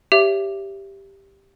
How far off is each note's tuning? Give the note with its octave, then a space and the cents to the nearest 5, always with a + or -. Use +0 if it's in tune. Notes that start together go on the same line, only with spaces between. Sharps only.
G4 +0 C#5 +35 E5 +20